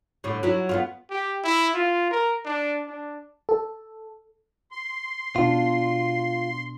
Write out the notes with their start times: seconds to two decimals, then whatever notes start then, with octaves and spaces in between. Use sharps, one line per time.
0.24 A2 D3
0.43 F#3 E4
0.69 B3 D4 F4
1.10 G4
1.44 E4
1.74 F4
2.11 A#4
2.46 D4
2.86 D4
3.49 A4
4.71 C6
5.36 B2 D4 F4